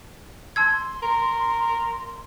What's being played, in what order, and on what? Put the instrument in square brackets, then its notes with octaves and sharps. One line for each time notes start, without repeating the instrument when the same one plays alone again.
[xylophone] A5 E6 G#6 [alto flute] C6
[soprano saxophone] A#4